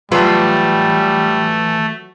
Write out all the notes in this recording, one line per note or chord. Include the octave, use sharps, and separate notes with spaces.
E3 F#3 G3 A3 F4 B4 A5